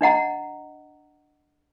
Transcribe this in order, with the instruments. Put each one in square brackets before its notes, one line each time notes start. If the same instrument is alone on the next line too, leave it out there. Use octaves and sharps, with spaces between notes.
[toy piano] D4 D#5 F#5 A#5